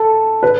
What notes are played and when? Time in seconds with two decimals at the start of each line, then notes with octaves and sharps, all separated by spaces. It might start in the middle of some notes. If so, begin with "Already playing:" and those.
Already playing: A4
0.43 B4